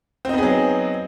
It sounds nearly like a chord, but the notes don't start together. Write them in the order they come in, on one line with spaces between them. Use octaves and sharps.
C4 D#4 B3 G#4 F#3